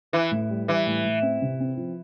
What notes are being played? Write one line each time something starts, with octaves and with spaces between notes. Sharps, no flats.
E3 E4
A2
G3
E3 G3
A2
A2
C4
C3
C4
F3